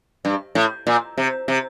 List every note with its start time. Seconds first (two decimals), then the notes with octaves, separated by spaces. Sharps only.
0.25 G2
0.55 A2
0.87 A#2
1.18 C3
1.48 C3